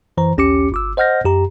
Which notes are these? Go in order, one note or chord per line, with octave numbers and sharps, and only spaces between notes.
F#2 E3 C5 A#5
A#1 D#2 C#4 G4 D6 C#7
G1 D6 E6
C5 D#5 F#5 F6 G6 A#6
F#2 G4 A#5